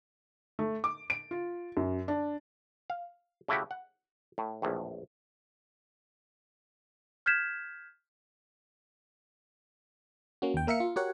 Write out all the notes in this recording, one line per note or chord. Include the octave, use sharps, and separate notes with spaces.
A3
D6
D7
F4
F#2
D4
F5
C#3 A3 E4 F#4 G4
F#5
A2
A#1 E2 A2
F6 G6 G#6 B6 E7
A#3 C#4 F#4
D#2 G5
A#3 A#4 E5 F5 C#7
F4
F#4 G4 A#4 C#5 F#5